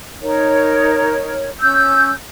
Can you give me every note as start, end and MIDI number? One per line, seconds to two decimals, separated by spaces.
0.22 1.49 63
0.22 1.49 70
0.22 1.49 73
1.60 2.12 61
1.60 2.12 88
1.60 2.12 91